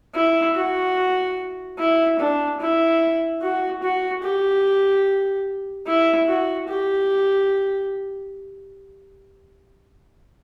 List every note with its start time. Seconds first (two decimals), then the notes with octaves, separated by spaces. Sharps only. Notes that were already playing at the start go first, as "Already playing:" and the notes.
0.14 E4
0.56 F#4
1.79 E4
2.19 D4
2.60 E4
3.42 F#4
3.83 F#4
4.23 G4
5.87 E4
6.28 F#4
6.68 G4